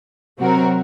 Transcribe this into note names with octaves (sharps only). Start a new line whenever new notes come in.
C3 F#3 C4 F#4 A#4